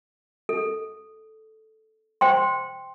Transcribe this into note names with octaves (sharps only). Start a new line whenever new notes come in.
A4
C5 G5 C6